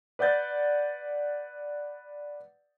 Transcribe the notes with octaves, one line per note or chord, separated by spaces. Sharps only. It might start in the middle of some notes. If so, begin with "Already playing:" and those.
B4 D5 F#5 G6 A6